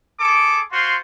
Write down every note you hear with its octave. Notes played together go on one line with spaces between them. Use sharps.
G#4 A4 D6
F4 F#4 C5 C6